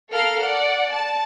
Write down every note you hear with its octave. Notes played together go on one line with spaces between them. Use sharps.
A4 A#4 F5 F6
D5 F#5
A5